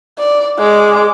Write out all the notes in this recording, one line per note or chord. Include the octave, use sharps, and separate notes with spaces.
D5
G#3 D6